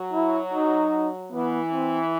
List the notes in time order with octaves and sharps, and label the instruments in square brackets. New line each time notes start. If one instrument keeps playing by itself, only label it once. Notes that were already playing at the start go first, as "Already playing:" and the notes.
Already playing: [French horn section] F#3
[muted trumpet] E4
D#4
[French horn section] E3 [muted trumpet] B3
[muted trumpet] C4